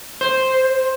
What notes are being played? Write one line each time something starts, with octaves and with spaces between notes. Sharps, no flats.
C5